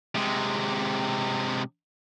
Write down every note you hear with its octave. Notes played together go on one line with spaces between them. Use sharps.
C3 G#3